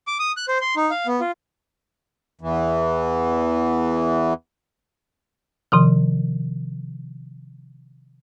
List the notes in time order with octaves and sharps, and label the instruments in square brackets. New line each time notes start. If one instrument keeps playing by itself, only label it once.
[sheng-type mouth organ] D6
D#6
F#6
C5
C6
D#4
F5
B3
F4
[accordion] E2 E3
[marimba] C3 D#3 F3